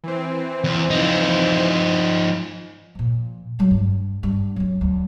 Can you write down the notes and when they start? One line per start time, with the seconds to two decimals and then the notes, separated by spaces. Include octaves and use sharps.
0.04 E3 C4
0.64 E2
0.90 F3 D#4
2.95 A#2 F3
3.59 F#3 G#3
3.71 G2
4.23 G2
4.56 F#3 C#4
4.81 D2 F#3